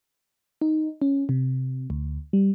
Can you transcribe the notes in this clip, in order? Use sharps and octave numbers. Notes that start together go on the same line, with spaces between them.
D#4
C#4
C3
D2
G3